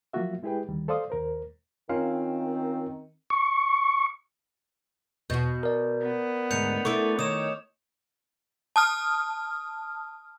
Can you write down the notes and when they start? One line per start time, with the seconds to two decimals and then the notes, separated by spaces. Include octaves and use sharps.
0.13 F3 F#3 A#3 F4 F#4 E5
0.43 G#3 E4 G4 G#4 B4 G5
0.69 D2 D#3 G3
0.88 A4 C5 D5 F5 C6 D#6
1.10 D#2 A#4 C5
1.89 D#3 C4 C#4 F4 F5
3.30 C#6
5.30 E2 B2 F#4 G6
5.63 A#4 D5
6.02 B3
6.51 D2 G#2 G6 C#7 F7
6.85 A3 E4 C#6 D6
7.19 D#3 C#5 D#6 E7
8.76 A5 D#6 F6